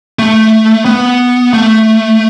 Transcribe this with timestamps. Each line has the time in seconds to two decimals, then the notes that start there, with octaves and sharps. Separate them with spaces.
0.19 A3
0.85 B3
1.53 A3